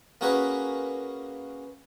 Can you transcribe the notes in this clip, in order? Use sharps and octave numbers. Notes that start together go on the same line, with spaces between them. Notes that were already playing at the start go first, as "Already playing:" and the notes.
A#3 C#4 F#4 G#4 A#4 B4